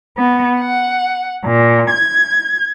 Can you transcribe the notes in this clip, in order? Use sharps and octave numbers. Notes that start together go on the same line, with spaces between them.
B3
F#5
A#2
G#6